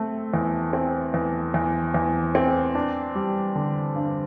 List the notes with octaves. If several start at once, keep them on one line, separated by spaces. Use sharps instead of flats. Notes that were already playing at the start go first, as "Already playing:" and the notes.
Already playing: A3 C4
E2
C4
E2
E2
E2
C4
D4
G3
D3
G2